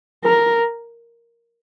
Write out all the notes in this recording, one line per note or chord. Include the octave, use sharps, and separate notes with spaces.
A#4